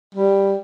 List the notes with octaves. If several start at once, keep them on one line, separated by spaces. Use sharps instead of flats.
G3